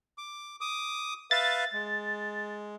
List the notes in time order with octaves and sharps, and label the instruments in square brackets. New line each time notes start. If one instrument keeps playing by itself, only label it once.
[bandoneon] D6
D6 D#6
[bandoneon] B4 E5 F5 [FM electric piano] A6
[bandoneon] G#3